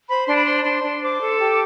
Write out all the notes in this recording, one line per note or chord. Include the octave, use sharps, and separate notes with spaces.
C5 B5
D4 C6
B5
C5 C6
D4 C6
D4
C5 D6
A4
G4